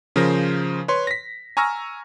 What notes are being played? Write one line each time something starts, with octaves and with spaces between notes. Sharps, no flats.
C#3 F3 A#4 C5 A#6
B4 C#5 C6
A#6 B6
G#5 A#5 C#6 E6 F6 A#6